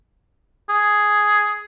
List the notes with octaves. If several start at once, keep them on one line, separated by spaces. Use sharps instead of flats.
G#4